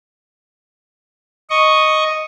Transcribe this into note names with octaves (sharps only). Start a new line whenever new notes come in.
D#5 C#6